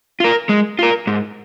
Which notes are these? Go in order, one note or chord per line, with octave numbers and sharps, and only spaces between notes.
F4 A#4
G#3
F4 A#4
G#2